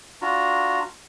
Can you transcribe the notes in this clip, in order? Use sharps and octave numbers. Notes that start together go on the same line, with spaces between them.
D4 F4 F#4 A#5